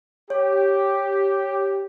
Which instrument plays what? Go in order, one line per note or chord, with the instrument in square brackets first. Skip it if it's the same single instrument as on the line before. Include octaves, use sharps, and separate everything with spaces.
[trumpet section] G4 [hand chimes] C#5